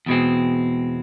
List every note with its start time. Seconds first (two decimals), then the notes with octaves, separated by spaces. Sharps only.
0.06 E2 B2 G#3 C4